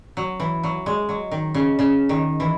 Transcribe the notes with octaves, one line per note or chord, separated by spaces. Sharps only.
F#3
E3
F#3
G#3
F#3
D#3
C#3
C#3
D#3
E3